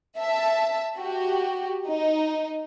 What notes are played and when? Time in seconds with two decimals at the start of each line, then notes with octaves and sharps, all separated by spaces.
0.17 E5 A5
0.97 F#4 G4
1.88 D#4